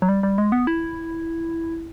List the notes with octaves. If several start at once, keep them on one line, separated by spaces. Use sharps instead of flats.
F#3
G3
G3
G#3
B3
E4